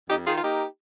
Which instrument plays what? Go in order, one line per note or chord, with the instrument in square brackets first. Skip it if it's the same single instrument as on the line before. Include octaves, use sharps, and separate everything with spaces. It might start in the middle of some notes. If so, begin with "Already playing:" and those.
[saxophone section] F2 D#4 G4
D#3 F4 G#4
F4
A#3 D#4 G4